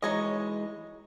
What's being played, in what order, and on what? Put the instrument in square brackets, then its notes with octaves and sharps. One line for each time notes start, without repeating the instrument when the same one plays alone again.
[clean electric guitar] E3 G#3 [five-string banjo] D#4 C#5 D#5